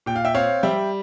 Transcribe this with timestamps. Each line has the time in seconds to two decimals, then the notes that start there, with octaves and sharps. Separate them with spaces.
0.06 A#2 G5
0.16 F5
0.25 E5 G5
0.35 C4 C#5 F5
0.63 G3 E5 G5